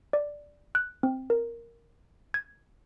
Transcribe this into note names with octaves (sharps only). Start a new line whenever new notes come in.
D5
F#6
C4
A#4
G#6